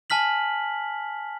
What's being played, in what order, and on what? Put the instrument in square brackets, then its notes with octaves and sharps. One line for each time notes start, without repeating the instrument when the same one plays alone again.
[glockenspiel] G#5 A5 F6 B6 F#7